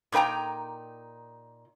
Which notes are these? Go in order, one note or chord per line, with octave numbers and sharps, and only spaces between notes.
A#2 D#4 B4 G5 A#5